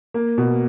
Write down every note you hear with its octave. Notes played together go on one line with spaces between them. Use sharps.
A#3
B2